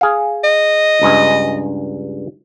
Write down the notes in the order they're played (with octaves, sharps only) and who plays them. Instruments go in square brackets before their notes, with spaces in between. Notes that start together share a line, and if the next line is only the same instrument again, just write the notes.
[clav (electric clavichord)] G#4 F5
[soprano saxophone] D#5
[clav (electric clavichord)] C#2 G2 G#4